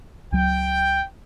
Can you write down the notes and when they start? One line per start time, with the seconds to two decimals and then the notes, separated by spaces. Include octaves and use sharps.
0.32 C#2 F#3 G5